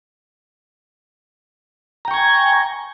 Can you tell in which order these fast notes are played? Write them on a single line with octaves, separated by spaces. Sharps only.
A#5 G5 C#6 G#6 G#5